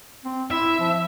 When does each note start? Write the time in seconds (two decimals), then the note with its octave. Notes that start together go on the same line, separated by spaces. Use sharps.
0.25 C4
0.51 E4 E5
0.80 F3